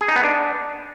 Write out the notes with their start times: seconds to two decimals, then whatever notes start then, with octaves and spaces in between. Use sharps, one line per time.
0.01 G#4
0.08 D#4
0.16 B3
0.23 D4